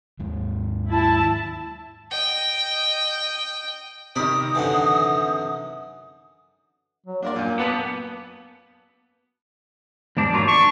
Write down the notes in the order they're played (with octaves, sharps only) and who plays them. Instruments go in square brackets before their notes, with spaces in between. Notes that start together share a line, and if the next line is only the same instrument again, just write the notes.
[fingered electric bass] D#2 G#2
[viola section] E4 A5
[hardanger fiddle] D#5 G5
[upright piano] C3 D#3 [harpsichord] D5 B5 [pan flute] D#6
[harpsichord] F#2 D3 E3
[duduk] F#3
[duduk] A#3 [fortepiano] D4 A#4 D5
[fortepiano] F#2 A#2
[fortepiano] F#2 A5 D6 [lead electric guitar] B3
[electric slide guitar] E2 G#2 D4
F#3 A#3 F4
[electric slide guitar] D4 [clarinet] C#6